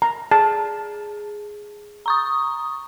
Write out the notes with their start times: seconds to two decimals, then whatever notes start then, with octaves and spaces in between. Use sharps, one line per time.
0.02 A#5
0.31 G#4 A5
2.06 A#5 C#6 D#6